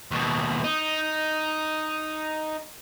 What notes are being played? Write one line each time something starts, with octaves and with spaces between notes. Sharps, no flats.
D#2 B2
D#4